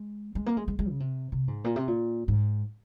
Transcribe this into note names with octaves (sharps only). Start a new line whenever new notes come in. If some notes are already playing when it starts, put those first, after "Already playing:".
Already playing: G#3
G#3
A#3
G#3
G#3
G#3
C#3
C3
C3
G#2
A#2
C3
A#2
G#2